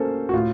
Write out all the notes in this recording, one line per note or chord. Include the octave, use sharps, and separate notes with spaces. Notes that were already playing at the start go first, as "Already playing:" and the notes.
Already playing: A#3 C#4 A4 C5
F#4
A2 F4